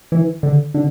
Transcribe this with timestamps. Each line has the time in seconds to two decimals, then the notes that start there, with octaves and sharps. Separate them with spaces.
0.12 E3
0.43 D3
0.74 D3